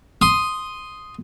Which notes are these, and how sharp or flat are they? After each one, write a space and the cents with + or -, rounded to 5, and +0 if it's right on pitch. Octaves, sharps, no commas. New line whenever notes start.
C6 +0 D#6 +0